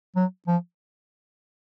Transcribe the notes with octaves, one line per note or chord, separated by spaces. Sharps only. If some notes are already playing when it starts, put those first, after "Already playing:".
F#3
F3